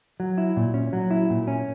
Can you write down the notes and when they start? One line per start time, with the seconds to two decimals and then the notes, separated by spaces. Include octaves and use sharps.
0.20 F#3
0.38 E4
0.57 A#2
0.74 C#4
0.93 F#3
1.11 E4
1.30 A#2
1.47 C#4